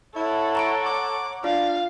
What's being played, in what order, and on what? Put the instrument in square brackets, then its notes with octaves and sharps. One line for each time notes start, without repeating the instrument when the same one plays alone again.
[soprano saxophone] E4 [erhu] A4 [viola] C#5 F#5
[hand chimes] A#5 C#6 D7
[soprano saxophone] D6
[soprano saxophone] D4 [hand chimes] F4 [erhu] F5